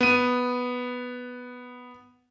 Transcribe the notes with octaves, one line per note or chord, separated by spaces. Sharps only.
B3 D#7